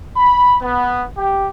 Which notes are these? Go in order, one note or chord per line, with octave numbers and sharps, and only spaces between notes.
B5
B3
G4